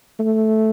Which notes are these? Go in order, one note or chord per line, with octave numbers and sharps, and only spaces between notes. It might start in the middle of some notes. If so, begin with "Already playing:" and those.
A3